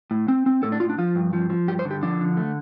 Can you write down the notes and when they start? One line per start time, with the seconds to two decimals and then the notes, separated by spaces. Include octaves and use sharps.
0.11 A2
0.28 C4
0.46 C4
0.63 A2 A4
0.72 D4
0.80 A2 F4
0.89 D4
0.98 F3 F4
1.15 G2
1.33 F3
1.50 F3
1.68 G2 G4
1.79 C5
1.85 D3
1.91 G4
2.03 F3 D4
2.21 D3
2.37 A3